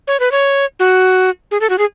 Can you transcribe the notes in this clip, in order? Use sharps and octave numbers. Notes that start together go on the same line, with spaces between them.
C#5
B4
C#5
F#4
G#4
A4
F#4
G#4